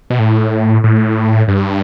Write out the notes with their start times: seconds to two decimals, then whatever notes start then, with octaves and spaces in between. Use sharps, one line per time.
0.10 B2
0.19 A2
0.84 A2
1.48 G2